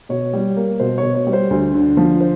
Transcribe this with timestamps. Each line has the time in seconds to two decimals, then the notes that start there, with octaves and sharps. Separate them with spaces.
0.09 B2 C#5
0.33 G3
0.56 A#3
0.80 B2 C5
0.98 C#5
1.03 B2
1.15 C#5
1.27 G3
1.33 C5
1.51 D2
1.73 D3
1.97 F3
2.21 C5